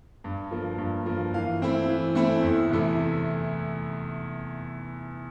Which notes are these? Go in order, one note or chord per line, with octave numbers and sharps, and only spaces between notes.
G2
F3 A#3
G2
F3 A#3
E3 F5
A3 C4 E4
E3
A3 C4 E4
E2
C3 E3 A3 E4